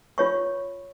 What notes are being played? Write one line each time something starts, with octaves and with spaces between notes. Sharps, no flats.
F4 C#5 C#6